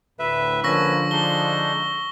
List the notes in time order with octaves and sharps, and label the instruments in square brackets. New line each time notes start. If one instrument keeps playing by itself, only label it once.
[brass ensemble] D2 A2 [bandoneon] B4 E5
[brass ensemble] D3 F3 [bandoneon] A#3 C#4 B4 [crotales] C#6 E6 A#6
[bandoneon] G#3 D4 D#4 [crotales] G7